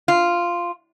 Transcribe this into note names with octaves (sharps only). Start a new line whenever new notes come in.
F4